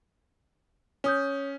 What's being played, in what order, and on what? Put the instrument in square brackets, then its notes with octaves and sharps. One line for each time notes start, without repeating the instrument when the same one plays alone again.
[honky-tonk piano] C#4 [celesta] C#5 D#6 G6